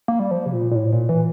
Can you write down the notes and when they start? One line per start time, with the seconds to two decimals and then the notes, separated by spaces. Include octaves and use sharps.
0.08 A#3
0.19 G3
0.31 F3
0.46 C3
0.53 A#2
0.71 A#2
0.75 A2
0.93 A#2
1.09 E3